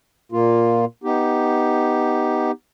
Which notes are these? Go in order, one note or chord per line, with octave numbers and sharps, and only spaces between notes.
A#2 A#3 F4
B3 D#4 G4